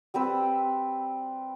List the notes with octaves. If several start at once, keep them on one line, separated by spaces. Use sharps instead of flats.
G3 C4 B4 E6